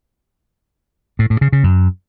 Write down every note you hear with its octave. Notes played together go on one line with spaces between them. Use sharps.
A2
A2
C#3
C#3
F#2